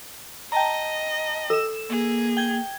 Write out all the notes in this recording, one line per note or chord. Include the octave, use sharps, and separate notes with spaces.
D#5 G5 A5 A#5
A4 E6 E7
A#3 G#4
G5 G#6